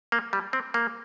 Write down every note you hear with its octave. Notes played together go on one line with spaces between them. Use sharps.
A#3
G3
C4
A#3